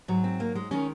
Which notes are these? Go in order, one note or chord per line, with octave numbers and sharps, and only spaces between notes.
G#2 F#3
C4
A#3
G#3
D#3 G#3 C#4